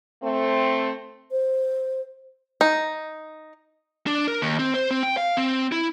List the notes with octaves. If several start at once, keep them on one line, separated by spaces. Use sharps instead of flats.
A3 C4
C5
D#4
D4
A#4
D#2
C4
C5
C4
G5
F5
C4
E4